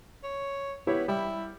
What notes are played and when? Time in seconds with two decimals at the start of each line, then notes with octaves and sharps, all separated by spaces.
0.23 C#5
0.87 B3 E4 G4 C#5
1.08 G3 E4